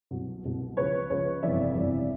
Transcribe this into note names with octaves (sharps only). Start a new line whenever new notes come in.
C2 B2 F#3
C2 B2 F#3
C#2 C#3 F3 B4 C#5
C#2 C#3 F3 B4 C#5
G1 F2 C3 E3 G3 D5 E5
G1 F2 C3 E3 G3